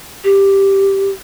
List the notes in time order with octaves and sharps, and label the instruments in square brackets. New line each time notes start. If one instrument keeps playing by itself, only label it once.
[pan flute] G4